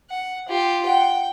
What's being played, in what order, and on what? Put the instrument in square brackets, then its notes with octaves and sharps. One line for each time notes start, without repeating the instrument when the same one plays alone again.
[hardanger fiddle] F#5
F4 G4
[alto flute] F#5 [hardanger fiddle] G5